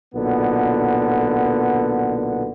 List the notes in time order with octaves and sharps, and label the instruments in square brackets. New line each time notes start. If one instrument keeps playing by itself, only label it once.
[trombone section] B1 A#2 D3 B3